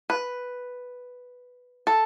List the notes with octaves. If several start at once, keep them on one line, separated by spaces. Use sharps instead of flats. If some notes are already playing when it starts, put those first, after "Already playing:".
B4
A4